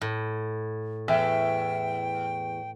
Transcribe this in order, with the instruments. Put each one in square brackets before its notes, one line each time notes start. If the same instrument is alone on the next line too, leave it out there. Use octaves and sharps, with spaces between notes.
[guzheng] A2
[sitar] E2 [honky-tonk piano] E5 [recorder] G5